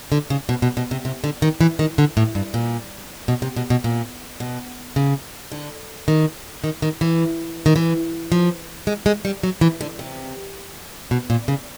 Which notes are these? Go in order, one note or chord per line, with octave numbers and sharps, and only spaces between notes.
D3
C#3
B2
B2
B2
C3
C3
D3
D#3
E3
D#3
D3
A2
G2
A#2
B2
C3
B2
B2
A#2
B2
C#3
D3
D#3
D#3
D#3
E3
D#3
E3
F3
G#3
G#3
G3
F#3
E3
D3
C3
B2
A#2
C#3